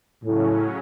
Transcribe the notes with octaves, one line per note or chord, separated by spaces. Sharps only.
A2 C#3 F#3 C#4